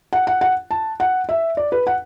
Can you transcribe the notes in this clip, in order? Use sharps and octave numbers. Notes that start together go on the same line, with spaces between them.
F#5
F#5
F#5
A5
F#5
E5
D5
B4
F#5